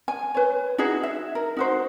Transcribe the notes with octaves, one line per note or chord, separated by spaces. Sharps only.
G#5
B4 C#5
D#4 E4 F#4 G#4
E5
A#4
D#4 F#4 C5